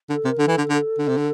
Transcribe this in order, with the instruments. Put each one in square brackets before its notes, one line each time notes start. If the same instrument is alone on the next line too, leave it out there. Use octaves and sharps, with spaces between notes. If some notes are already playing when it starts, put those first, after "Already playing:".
[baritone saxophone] D3 [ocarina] A4
[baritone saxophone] C3
[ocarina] A#4
[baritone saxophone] D3 [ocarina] A4
[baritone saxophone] E3
D3
D3
D3
C3
D3